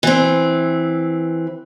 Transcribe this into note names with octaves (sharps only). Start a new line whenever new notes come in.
E3 C4